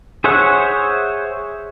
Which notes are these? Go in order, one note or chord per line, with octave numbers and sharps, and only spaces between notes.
G#4 C5 C#5 E5 F#5